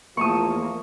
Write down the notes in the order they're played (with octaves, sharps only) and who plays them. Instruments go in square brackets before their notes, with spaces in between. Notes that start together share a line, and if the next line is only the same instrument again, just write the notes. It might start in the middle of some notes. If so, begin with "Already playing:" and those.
[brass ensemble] E2 F3 F4 [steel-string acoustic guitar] A3 A5 [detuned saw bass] A#3 [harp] C#6 D#6